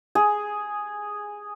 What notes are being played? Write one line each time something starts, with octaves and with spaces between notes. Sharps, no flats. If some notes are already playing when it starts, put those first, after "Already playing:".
G#4